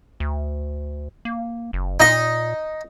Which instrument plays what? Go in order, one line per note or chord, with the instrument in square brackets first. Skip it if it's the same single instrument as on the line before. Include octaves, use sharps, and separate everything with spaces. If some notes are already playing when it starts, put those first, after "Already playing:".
[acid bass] D2
A#3
F#1
[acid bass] A#2 [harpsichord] D#4 D#5